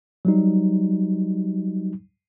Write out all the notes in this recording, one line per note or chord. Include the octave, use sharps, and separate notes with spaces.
F#3 G3 D#4